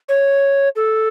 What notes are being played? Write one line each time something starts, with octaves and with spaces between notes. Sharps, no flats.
C#5
A4